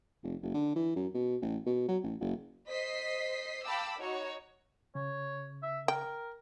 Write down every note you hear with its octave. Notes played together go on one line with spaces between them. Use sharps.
F1
F#1
D3
E3
F#2
B2
A1
B2
F#3
A1
F#1
C5 D#5 B6 C7
F5 G5 A5 B5 D6 E6
D#4 F#4 C#5
C#3 C#5
E5
A#4 G5